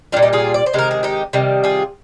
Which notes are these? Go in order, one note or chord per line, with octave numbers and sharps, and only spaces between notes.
A#2 G3 D4 F4
D#4 G4
F4 G#4
D5
C5
C3 D#3 G#3 A#4
G#4
D#4 G4
C3 D#3 G3
F4 G#4